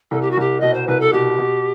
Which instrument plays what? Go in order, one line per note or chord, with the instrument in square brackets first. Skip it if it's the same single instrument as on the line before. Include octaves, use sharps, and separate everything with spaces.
[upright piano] C2 [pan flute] A4
[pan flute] G4
F#4
[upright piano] C2 [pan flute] G4
[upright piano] B2 [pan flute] D#5
[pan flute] C5
[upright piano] C2 [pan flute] B4
[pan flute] A4
[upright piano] B2 [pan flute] G4
[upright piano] B2